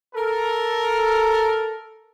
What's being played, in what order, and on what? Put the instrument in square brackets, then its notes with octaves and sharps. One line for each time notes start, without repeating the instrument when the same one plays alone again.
[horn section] A4 A#4